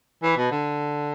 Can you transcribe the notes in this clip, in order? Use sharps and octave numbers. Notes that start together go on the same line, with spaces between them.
E3
B2
D3